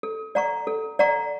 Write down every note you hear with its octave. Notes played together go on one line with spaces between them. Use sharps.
A4
D5 F#5 A#5 C#6
A4
D5 F#5 A#5 C#6